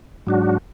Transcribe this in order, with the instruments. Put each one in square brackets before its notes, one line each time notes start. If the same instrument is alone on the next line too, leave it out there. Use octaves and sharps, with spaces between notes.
[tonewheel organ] G#2 F#3 D4 F#4